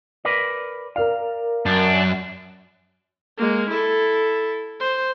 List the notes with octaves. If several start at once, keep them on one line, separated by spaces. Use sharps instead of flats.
A#4 B4 D5
A#4 D5 F5
F#2 D4
G#3 A#3
E4 A4
C5